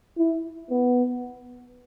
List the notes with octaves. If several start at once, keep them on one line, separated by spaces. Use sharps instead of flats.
E4
B3